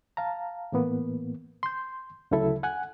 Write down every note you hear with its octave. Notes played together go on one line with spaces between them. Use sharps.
F5 A5 A#5
A2 E3 A#3 B3
C6 G6
D2 C#3 F#3 E4 A4 E5
F#5 G#5 F#6